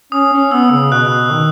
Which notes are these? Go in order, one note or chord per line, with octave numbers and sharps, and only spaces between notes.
C#4 D#6
C#4
B3 E6
C#3
B2 F#6
D#3